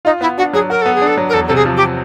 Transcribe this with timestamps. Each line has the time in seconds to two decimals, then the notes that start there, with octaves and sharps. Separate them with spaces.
0.05 D#4 F4
0.21 B3 E4
0.37 D4 F#4
0.53 F#3 G#4
0.70 F#4 A#4
0.81 B3 A4
0.94 G#4
1.01 D4
1.07 A4
1.18 F#3
1.29 A#4
1.33 E2 A4
1.47 C3 A4
1.55 G#4
1.65 F3
1.76 G4